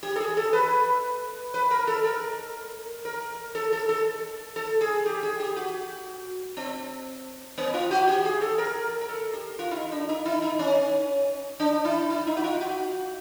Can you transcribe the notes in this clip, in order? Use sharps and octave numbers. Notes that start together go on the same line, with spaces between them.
G4
A4
G#4
A4
B4
B4
A#4
A4
A#4
A#4
A4
A4
A4
A4
G#4
G4
G#4
G4
F#4
C4
B3
F4
F#4
G4
G#4
A4
A#4
A#4
A4
G4
F4
E4
D#4
D4
D#4
E4
D#4
C#4
D4
E4
E4
D#4
F#4
F4
F#4